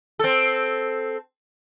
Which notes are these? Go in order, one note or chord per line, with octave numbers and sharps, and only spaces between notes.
C4 A4